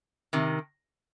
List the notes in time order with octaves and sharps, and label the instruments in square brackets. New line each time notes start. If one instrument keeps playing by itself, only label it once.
[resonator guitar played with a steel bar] C3 D#3